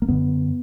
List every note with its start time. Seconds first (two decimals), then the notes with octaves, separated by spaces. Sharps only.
0.02 A#3
0.08 F#2 D3 B3